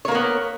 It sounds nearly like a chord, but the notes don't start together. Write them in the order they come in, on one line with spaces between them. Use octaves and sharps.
C#5 A#3 A#4 B3